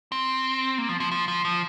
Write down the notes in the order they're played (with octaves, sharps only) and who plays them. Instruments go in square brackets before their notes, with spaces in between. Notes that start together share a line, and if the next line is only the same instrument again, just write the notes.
[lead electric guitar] C4
A#3
F3
F3
F3
F3
F3